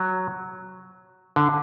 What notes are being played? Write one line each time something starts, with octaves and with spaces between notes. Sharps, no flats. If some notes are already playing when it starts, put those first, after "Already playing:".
Already playing: F#3
D3